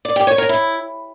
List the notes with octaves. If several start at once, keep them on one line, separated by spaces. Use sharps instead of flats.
D5
G4
C#5
A#4
E4